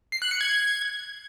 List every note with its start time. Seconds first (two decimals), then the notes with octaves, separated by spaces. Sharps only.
0.12 C7
0.22 F#6
0.31 C#7
0.41 G#6